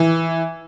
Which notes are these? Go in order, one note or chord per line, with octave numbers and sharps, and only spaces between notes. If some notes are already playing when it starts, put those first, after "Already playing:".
Already playing: E3